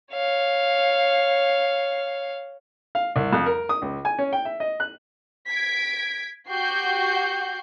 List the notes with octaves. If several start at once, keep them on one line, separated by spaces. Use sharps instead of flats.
C#5 F5
F5
C2
F2
A#4
D#6
C#2
G#5
C#4
G5
E5
D#5
F#6
G#6 B6 D7
F#4 G4 F#5 C#6 G6 C7